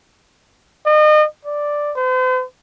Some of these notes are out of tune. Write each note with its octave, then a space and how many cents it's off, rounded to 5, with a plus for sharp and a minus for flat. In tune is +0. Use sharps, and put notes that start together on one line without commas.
D#5 -35
D5 +0
C5 -45